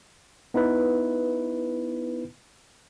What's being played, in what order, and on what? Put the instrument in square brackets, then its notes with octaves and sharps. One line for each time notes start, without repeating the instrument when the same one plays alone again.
[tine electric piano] B3 D#4 E4 B4